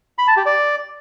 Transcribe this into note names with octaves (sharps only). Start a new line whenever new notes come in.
B5
A5
G4
D5